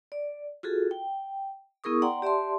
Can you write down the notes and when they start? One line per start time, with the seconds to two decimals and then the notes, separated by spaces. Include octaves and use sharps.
0.12 D5
0.63 F4 F#4 G#4 A4
0.91 G5
1.84 B3 E4 G#4 A#4 C#6 D#6
2.02 D5 F#5 G5 A#5 C6
2.22 G4 D5 E5 A5 C6